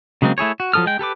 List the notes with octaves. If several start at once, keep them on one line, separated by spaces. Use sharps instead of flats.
C#3 F#3 G#3 A#3 C4
A3 E4 G#4 C#5
F#4
F3 F#3 A4 D#6 F6
G#3 G5
G4 A4 B4 D6